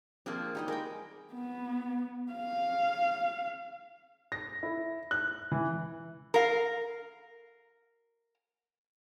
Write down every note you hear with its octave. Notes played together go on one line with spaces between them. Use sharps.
F3 A#3 C4 D4 G#4
G3 D#4 D#5
G#3 A#4 G5
B3
F5
A#6
E4
F#6
E3
A#4 F5